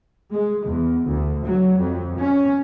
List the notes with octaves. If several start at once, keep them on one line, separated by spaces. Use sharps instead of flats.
G#3
E2
D2
F#3
F2
C#4